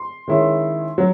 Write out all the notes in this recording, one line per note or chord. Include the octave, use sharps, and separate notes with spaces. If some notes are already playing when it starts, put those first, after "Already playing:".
Already playing: C6
D#3 G#3 C#4 E4
F#3